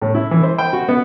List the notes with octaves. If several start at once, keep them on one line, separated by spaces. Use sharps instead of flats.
A2
E4
E3
C5
G5
F#4
B3